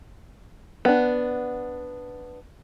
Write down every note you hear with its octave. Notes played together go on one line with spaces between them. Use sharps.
B3 D4